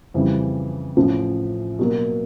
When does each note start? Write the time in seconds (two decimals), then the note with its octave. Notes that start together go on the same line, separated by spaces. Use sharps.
0.14 F2 C#3 E3 G3
0.97 A1 A2 F3
1.79 B2 F#3 A#3